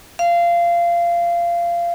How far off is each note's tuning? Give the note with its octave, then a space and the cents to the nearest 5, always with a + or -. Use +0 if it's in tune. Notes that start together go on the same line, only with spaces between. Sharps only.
F5 -20